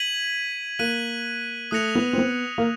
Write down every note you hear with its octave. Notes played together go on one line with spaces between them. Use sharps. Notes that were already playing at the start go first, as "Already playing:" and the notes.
Already playing: G#6 B6 D#7 F#7
A#3 F#6 B6 D#7 F#7
A3 D#6 F#6 A#6 C#7 F7
B3
C4
B3
A#3